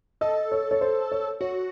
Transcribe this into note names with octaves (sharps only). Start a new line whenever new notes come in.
A4 D#5
C#5
C#5
C5
C#5
F#4 C#5